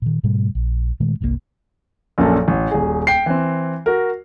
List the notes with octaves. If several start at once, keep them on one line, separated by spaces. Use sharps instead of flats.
A#2 D#3
G#2 B2 G3 A3
A#1
A#2 D#3 G#3 A3
G1 C2 C3 A#3
A#1 F#2 A#2 A#3 A4
A1
D#1 G#4
G5 C7
E3 C4
F#4 A#4